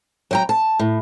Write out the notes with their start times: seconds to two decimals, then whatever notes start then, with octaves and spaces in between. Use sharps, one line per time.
0.31 F#3 G5 A#5
0.49 A5
0.79 A2